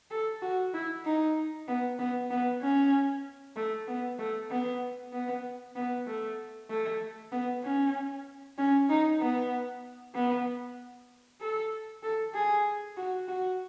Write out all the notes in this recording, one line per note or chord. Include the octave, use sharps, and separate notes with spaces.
A4
F#4
E4
D#4
B3
B3
B3
C#4
A3
B3
A3
B3
B3
B3
A3
A3
B3
C#4
C#4
D#4
B3
B3
A4
A4
G#4
F#4
F#4